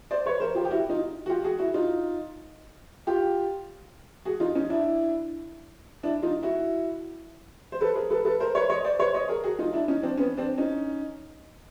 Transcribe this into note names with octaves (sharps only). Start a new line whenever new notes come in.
C5 D5
B4 C#5
A#4 C5
F4 G4
G4
E4 F#4
D#4 F4
F#4
F4 G4
F#4 G#4
E4 F#4
D#4 F4
F4 G4
F#4 G#4
D#4 F4
C#4 D#4
D4 E4
D4 E4
D#4 F4
E4 F#4
C5
A4 B4
G#4 A#4
A4 B4
A4 B4
A#4 C5
B4 C#5
C#5 D#5
C5 D5
B4 C#5
C#5 D#5
G#4 A#4
F#4 G#4
D#4 F4
D4 E4
C#4 D#4
C4 D4
B3 C#4
C4 D4
C#4 D#4